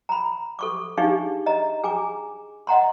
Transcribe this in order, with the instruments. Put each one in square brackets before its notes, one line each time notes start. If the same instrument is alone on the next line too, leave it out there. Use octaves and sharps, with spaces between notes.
[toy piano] A#5 B5
A4 C#6 D6
D4 D#4 G4 G#4 F5 C#6
D#5 A#5
G#4 G#5 A#5 D6
D#5 F#5 A#5 C6